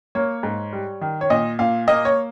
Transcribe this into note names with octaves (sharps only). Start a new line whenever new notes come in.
A#3 C#5
G#2
G3
D#3
C#5
A#2 D#5
A#2 F5
A#3 D#5
C#5